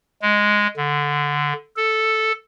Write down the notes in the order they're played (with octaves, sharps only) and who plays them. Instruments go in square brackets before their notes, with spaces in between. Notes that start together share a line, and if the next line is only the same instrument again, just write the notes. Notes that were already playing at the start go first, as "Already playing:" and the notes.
[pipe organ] G#3
D3
A4